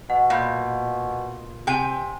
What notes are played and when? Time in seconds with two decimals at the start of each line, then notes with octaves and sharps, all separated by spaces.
0.10 B2 F#5
0.30 A#2 F5 B5 G6
1.67 C3 G5 G#5 D#7